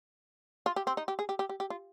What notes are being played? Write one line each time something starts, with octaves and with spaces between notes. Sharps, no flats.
F4
G4
C4
D#4
G4
G#4
G4
G4
G4
G4
F4